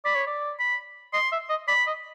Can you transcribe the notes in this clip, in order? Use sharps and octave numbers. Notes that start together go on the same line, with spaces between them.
D5 B5
C#5
D5
B5
D#5 C6
E5
D#5
D5 B5
D#5